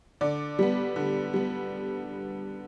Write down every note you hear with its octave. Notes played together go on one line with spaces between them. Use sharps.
D3 D5
G3 B3
D3
G3 B3